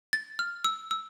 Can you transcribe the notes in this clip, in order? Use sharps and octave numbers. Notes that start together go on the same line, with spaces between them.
A6
F6
E6
E6